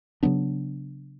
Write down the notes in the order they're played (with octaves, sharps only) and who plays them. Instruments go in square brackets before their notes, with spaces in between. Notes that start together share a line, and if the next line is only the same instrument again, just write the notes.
[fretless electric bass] C#3 F#3 B3 D4